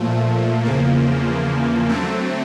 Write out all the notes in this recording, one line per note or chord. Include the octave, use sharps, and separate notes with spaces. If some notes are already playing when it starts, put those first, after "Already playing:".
Already playing: A#2 F3 A3
E2 C#3 F3 A#3
D3 F#3 A3 C4